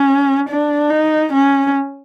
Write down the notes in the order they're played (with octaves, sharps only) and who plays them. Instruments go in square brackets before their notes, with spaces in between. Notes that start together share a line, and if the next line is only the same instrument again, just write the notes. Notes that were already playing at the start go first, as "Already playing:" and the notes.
Already playing: [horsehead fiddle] C#4
D4
D#4
C#4